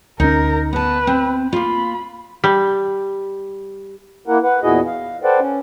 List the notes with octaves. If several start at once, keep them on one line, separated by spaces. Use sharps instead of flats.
D2 C#4 D#4 A#4
B3 B4 A5
C4
A#3 F4 B5
G3
A#3 E4 A#4 F#5
B4 F#5
E2 A#2 E4 F#4 G#4 D#5
F5
A4 B4 C5 D5 F#5 G5
C#4